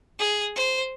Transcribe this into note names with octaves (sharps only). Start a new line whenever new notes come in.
G#4
C5